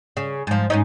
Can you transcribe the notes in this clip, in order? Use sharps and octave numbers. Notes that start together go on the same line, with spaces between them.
C#3
G#2 F3
G#2 C#4 D#4